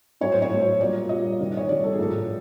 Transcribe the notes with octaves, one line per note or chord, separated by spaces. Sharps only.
A2 F#3 A3 C#5
C5
C#5
A2 F#3 A3
A#2 G3 A#3 D5
A#2 G3 A#3 D#5
C3 D#3 G3
C#5
C3 D#3 G3 D5
A4
G#4
A2 F3 A#3 A4